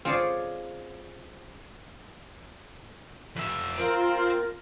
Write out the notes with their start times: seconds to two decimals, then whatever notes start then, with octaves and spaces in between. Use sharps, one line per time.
0.05 C4 F4 G#4 C#5 D5
3.36 F2 E5
3.77 C4 F4 A#4